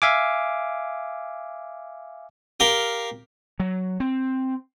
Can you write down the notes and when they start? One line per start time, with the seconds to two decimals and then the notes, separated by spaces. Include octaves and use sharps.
0.02 E5 F5 G#5 D6
2.60 G4 A#4 F5 G5
3.60 F#3
4.00 C4